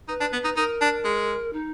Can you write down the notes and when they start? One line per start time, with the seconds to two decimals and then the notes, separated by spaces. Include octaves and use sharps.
0.08 D#4 B4
0.20 D4
0.33 B3
0.44 D#4
0.56 D#4 A#4
0.81 D4
1.05 G#3
1.53 D#4